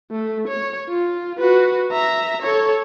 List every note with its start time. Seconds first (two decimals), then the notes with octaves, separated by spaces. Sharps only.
0.11 A3
0.47 C#5
0.89 F4
1.39 F#4 B4
1.92 E5 A#5
2.42 A4 C#5